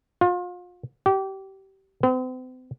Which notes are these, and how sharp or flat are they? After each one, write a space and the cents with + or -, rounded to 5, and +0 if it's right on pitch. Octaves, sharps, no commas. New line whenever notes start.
F4 +35
G4 -25
C4 -45